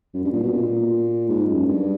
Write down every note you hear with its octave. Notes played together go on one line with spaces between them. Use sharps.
F#2
G2
A#2
B2
A#2
G#2
F#2
G2